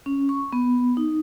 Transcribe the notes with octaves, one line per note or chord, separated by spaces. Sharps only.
C#4
C#6
B3
D#4